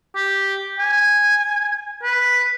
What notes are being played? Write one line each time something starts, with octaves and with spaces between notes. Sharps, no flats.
G4
G#5
B4